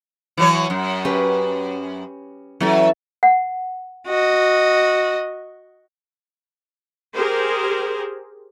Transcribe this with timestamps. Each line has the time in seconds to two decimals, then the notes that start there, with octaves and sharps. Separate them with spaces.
0.37 E3 F#3 C#5
0.70 F#2
1.05 C#4 G4 B4
2.60 E3 F#3 C#4 A4
3.23 F#5
4.07 F#4 D#5
7.15 G4 G#4 A#4 C5